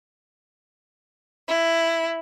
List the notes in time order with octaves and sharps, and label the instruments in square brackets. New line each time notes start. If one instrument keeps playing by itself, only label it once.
[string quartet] E4